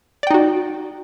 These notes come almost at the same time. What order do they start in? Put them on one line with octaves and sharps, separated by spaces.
D5 G5 D#4 F#4